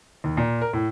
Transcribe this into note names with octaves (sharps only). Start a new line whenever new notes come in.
D#2
A#2
A#4
A2